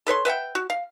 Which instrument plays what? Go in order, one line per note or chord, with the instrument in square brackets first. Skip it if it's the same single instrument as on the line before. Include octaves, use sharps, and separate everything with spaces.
[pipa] A4 B4 C#5 C6
B4 E5 F#5 G5
F#4
F5